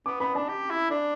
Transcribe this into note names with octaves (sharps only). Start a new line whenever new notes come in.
B3 D6
B3 B5
D4 A5
G4
E4
D4